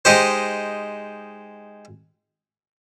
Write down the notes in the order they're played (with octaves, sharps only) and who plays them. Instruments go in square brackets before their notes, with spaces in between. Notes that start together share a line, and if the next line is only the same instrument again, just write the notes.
[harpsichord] G#3 D#4 G4 C5